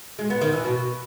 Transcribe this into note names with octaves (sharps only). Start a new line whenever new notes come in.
G#3
B3
D#3
E3
B2